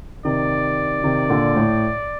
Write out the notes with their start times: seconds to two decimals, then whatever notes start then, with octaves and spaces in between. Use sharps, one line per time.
0.25 C3 D#3 D5
1.04 C3 D#3
1.30 A#2 D3
1.56 A2